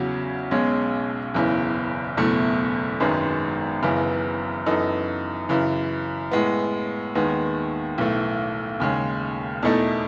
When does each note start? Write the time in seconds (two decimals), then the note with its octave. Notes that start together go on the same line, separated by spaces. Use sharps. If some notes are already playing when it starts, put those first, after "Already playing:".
Already playing: E2 C#3 F#3 C#4 F#4
0.51 B1 B2 G#3 C#4
1.34 F#1 E2 C#3 E3
2.17 F#1 E2 B2 A3
3.00 G#1 F#2 D#3 G#3 B3
3.83 F#1 F#2 C#3 E3 B3
4.66 F#2 E3 B3 D#4 A4
5.49 F#2 C#3 E3
6.31 A2 G#3 B3
7.15 D#2 D#3 G#3 B3
7.98 B1 A2 E3 A3
8.80 D#2 C#3 G#3
9.63 E2 B2 A3 D#4 A4